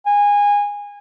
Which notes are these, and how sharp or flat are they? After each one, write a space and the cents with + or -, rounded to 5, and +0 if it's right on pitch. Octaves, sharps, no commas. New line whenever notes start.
G#5 -20